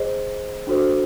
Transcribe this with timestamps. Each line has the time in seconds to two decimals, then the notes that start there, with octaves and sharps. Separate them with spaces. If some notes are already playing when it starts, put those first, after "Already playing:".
Already playing: G#4 C5 D#5
0.67 D4 F#4 A4 C5